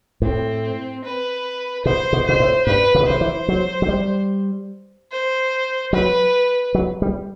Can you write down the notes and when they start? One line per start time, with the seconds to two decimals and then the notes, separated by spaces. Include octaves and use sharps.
0.22 A2 C4
1.04 B4
1.85 B2 C5
2.13 B2
2.26 B2 C5
2.40 A2
2.67 G2 B4
2.95 C3
3.02 B2
3.08 C3 C5
3.21 E3
3.48 F#3
3.82 F#3
3.89 G3
5.12 C5
5.93 F#3 B4
6.75 F#3
7.02 G3